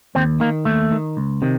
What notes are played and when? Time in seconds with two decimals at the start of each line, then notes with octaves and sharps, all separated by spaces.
0.15 D#2 C4
0.40 D#3 A#3
0.65 D#2 A3
0.92 D#3
1.17 C#2
1.42 C3 D#3